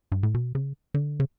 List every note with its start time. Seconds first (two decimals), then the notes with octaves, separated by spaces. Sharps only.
0.12 G2
0.23 A2
0.34 B2
0.55 C#3
0.94 D3
1.20 C#3